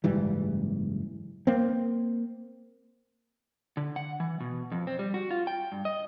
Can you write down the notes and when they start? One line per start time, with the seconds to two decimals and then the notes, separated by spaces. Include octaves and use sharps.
0.04 F#1 G#2 E3 G3
1.47 A#3 C4
3.77 D3
3.96 F#5
4.20 E3
4.40 B2
4.72 F2
4.87 C4
4.99 G3
5.14 F#4
5.31 F4
5.47 G5
5.72 G2
5.85 D#5